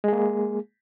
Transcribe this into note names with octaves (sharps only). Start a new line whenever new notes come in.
G#3 A#3 G#4